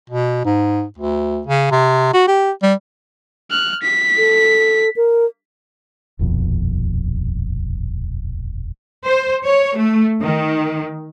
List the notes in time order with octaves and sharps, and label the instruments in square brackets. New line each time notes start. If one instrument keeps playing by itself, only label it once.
[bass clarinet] B2
G#2
D2
C#3
C3
F#4
G4
G3
[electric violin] F6 F#6
B6
[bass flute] A4
A#4
[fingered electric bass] D#1 A#1 F2 B2
[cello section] C5
C#5
A3
D#3